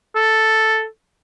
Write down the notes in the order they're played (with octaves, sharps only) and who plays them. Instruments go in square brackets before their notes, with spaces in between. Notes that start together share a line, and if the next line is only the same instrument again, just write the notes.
[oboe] A4